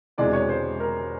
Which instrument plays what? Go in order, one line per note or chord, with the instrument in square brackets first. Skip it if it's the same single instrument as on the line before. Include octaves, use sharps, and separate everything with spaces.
[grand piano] E1 E2 C3 E3 G#3 D5
C#5
C5
A#4